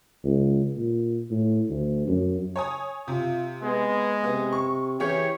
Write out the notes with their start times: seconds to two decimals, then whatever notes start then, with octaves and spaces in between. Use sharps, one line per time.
0.25 C#2
0.77 A#2
1.31 A2
1.70 D2
2.08 F#2
2.56 C#5 G#5 D#6
3.08 C3 F4
3.63 G#3 B3
4.24 C3 B3
4.52 C#6
5.00 E3 C#4 G4 G#4 C#5